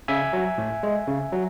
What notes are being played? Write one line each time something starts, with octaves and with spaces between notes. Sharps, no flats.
C#3 E5 G#5
F#3
A2
G#3
C#3
F#3